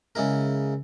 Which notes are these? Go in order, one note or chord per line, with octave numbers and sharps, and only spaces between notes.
C#3 G#3 E4 A#4